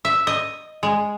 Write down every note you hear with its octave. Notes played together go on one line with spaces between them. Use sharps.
E5
D#5
G#3